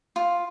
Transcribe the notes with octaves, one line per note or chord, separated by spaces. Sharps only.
F4